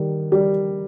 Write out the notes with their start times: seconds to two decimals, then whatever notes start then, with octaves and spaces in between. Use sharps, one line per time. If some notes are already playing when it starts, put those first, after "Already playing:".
Already playing: D#3 G3
0.32 G3